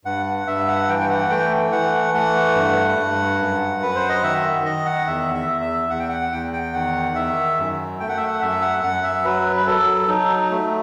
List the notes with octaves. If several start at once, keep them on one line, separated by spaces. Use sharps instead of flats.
G2 F#5
F#5
G2 E5
F#5
E3 G5
G5
F#5
A3 G5
E3 F#5
A3 F#5
G2
G2
F#2
F#2 B4
C5
D#5
D#3 E5
D#3 D#5
F#5
E2 E5
E5
E2
E5
E2 F#5
G5
F#5
E2 G5
G5
D#3 F#5
D#3 E5
F#2
A3 G5
F#5
E5
F#5
F#2 E5
F#5
F#2 F#5
E5
F#3 B4
B4
F#3 A4
F#3 D#4
A3